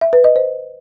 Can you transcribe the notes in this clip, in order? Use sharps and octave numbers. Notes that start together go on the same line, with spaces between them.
E5
B4
D#5
C5